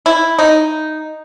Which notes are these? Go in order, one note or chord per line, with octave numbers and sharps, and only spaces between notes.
E4
D#4